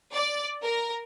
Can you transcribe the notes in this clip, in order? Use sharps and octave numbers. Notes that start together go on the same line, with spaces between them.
D5
A#4